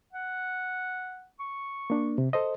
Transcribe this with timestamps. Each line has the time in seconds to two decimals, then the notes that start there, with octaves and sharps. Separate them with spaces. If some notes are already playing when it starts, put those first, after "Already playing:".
0.13 F#5
1.39 C#6
1.90 A#3 D4
2.18 C3
2.33 A4 C5 D#5